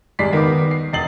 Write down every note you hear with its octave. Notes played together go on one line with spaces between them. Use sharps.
G#1 G3 G#3 D5 B6 C7
D#3 B3 D#4 D6
C7
E1 D#5 A6 C7 F#7